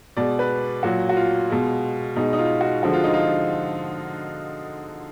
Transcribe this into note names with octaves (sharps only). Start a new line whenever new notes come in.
B2 G#3 D5
B4
A#2 F#3 F#4
F#4
F4
B2 G#3
B2 G#3 D#4
D#4
F4
F#4
D3 F3 G#3 F#4
F4
D#4
F4